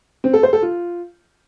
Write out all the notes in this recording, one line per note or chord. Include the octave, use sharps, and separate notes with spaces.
C4
A4
C5
A4
F4